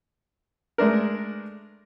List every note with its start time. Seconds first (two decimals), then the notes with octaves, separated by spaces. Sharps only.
0.78 G#3 A3 D4 A#4